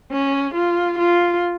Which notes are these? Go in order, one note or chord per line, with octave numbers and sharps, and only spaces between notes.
C#4
F4
F4